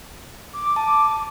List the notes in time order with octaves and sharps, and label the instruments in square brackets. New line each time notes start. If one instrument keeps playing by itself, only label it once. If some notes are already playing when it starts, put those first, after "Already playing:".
[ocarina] D6
[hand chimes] A5